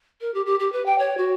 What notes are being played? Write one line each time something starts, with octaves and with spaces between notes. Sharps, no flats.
A#4
G4
G4
G4
B4
G5
C#5
F#4